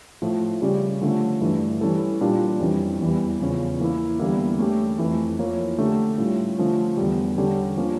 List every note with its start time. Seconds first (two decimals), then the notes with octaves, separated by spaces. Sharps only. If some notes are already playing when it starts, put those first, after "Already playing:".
0.22 A2 F3 A3
0.62 C#3 G3 C#4 G4 D5
1.01 D3 F3 A3 C#4
1.41 G2 E3 A3
1.81 E3 G3 C#4 E4 A4
2.21 A#2 G3 D4 F4 A#4
2.60 F2 E3 G3 C#4
3.00 E2 E3 G3
3.40 E2 C#3 F3 C#4
3.80 E3 A#3 E4
4.19 E2 D3 G3 A#3 E4
4.59 A3 C#4 G4
4.99 F2 E3 A3
5.39 F3 A#3 E4 A#4 C#5
5.78 D3 A3 C#4 G4
6.18 A2 G3 C#4 F4
6.58 D3 F3 A3 C#4
6.97 E2 D3 G3
7.37 D3 G3 C#4 G4
7.77 F3 A#3 C#4